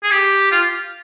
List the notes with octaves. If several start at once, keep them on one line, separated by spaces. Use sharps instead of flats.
G#4
G4
F4